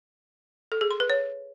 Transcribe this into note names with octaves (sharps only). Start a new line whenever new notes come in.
A4
G#4
C6
B4
C#5